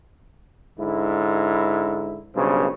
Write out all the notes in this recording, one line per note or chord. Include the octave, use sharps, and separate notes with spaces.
G#2 D3 E4
B1 G2 C#3 C5